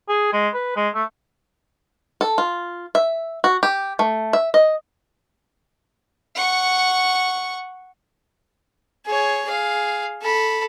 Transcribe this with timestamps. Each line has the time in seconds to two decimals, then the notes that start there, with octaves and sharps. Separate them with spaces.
0.09 G#4
0.33 G#3
0.54 B4
0.76 G#3
0.95 A3
2.21 A4
2.38 F4
2.95 E5
3.44 F#4
3.63 G4
3.99 A3
4.33 E5
4.54 D#5
6.35 F#5 C#6
9.06 G#4 C#5
9.46 G#4 F5
10.22 A4 B5